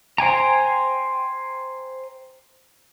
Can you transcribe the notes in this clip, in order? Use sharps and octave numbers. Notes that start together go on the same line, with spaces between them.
C5 G5 G#5 A#5